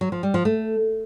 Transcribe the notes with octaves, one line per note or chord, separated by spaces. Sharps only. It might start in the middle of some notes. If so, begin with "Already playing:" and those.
F#3
F3
G3
F3
A3